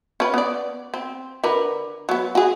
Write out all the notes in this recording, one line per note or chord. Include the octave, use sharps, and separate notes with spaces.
C#4 B4
B3 D5
C4
D3 A#4 B4
F#3 B3
F#4 G#4